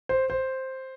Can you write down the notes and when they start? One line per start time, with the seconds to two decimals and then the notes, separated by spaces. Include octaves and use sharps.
0.09 C5
0.30 C5